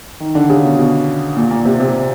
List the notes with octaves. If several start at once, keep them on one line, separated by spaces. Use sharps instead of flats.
D#3
D3
C#3
B2
B2
A#2
A#2
C3
C3